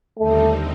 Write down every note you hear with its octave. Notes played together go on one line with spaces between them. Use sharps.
D#2 D3 G3 A3 C4 D#4